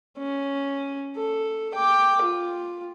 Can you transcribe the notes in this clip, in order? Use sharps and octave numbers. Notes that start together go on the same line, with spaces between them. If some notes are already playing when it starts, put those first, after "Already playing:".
C#4
A4
G5 D6
F4